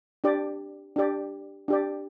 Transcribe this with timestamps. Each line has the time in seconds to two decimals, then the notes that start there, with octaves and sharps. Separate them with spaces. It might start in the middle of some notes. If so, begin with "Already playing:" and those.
0.24 D4 G4 D5
0.96 D4 G4 D5
1.68 D4 G4 D5